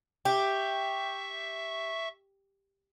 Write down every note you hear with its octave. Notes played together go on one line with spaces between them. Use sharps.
G4 E5 C#6